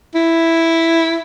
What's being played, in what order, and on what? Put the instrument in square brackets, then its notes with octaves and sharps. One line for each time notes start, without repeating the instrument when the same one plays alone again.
[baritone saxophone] E4